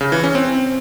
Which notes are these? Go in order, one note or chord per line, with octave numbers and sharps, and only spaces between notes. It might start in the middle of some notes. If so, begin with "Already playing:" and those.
C#3
E3
C#4
C4